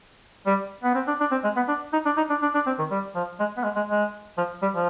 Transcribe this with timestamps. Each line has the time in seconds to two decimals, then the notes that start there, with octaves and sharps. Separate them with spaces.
0.46 G3
0.84 B3
0.95 C4
1.08 D4
1.20 D4
1.32 C4
1.44 G#3
1.56 B3
1.68 D4
1.93 D#4
2.06 D4
2.17 D#4
2.30 D4
2.42 D4
2.54 D4
2.66 C4
2.79 D#3
2.91 G3
3.16 F3
3.40 G#3
3.57 B3
3.64 G#3
3.76 G#3
3.89 G#3
4.38 F3
4.62 G3
4.74 F3